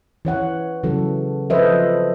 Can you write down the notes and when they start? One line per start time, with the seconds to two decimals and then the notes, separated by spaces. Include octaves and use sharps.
0.25 E3 C#5 F#5
0.83 C#3 E3 F#3 A4
1.50 F3 A4 B4 C5 D#5 E5